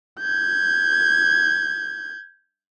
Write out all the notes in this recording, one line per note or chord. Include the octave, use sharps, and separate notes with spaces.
G6 G#6